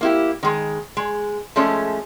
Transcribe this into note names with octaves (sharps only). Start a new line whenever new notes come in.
A#3 E4 G4
D#3 G#3
G#3
F3 G#3 A3 C#4